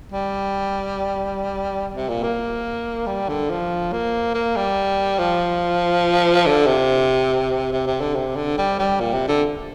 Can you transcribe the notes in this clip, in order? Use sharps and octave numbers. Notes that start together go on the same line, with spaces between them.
G3
C3
A#2
A#3
G3
D3
F3
A#3
A#3
G3
F3
D3
C3
C3
C3
D3
C3
D3
G3
G3
A#2
C3
D3